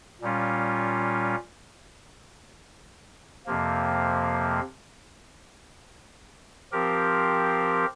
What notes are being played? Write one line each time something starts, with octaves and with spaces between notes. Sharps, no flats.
A#2 G3 C#4 F4
F2 C3 F3 A#3
F3 C4 G4 A#4